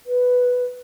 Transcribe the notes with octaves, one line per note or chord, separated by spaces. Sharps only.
B4